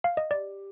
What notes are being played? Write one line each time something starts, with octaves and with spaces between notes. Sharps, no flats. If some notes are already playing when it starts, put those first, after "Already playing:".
F5
D#5
G4 D5